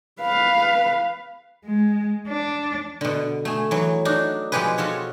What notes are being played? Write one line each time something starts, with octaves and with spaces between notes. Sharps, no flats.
B4 F5
G#3
D4
B2 D3
A3 G#4
E3 F#3
D4 D#4 F#4
B2 F3 G#3 G4 G#4 B4
F4 F#4 A4 C#5